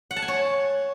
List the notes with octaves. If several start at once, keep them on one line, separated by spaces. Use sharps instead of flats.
F#5
A5
G#5
C#5